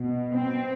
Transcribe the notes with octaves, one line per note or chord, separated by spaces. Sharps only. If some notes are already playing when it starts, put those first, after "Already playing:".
Already playing: B2
C4